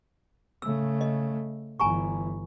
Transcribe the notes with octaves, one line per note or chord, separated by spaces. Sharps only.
C#3 A3 E6
D#5
G1 E3 G#5 A#5 C#6